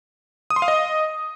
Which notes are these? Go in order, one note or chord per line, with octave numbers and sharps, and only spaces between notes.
D#6
C6
F5
D#5